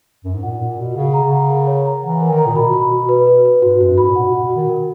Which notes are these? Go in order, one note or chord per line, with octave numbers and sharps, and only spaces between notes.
F#2
G#2
A#2 F#5
A#2 A#4
B2 F#5
C#3 F#5
A#5
C#3
F#5
A#4
C#5
A#5
E3 F#5
A#4
D#3
A#5
A#2
B2 B5
B5
F#4
B4
B4
B4
G#2 F#4
F#2 F#4
G#2 B5
A#2
B2 F#5
B2 F#4
B2
F#4
D#3
A#4